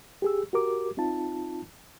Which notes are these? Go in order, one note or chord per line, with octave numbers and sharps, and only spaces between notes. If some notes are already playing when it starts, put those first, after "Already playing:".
G4 G#4 E6
F#4 G4 A#4 D6
C4 D#4 F4 A5